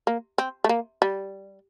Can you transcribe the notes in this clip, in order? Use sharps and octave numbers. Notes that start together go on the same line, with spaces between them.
A#3
C4
A3
A#3
G3